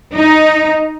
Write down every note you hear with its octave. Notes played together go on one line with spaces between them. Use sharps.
D#4